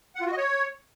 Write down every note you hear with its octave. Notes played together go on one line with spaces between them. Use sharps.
F#5
F4
F#4
D#5
C#5